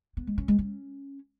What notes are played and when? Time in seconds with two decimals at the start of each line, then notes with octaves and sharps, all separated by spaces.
0.17 B3
0.27 G#3
0.38 C#4
0.48 G#3
0.59 C#4